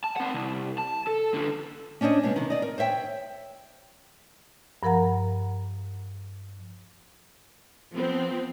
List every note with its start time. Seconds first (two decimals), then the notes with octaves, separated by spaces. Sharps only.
0.04 A5
0.17 C4 F#5
0.34 C2
0.78 A5
1.07 A4
1.34 D3 F4
2.01 C#4 D4 C5 C#5 D#5
2.23 B2 G#3 B3
2.36 C3 D#3
2.50 D5 D#5
2.62 A#4
2.78 C5 C#5 E5 G5
4.83 G2 F3 A#4 F#5 A#5
7.95 F3 B3 C4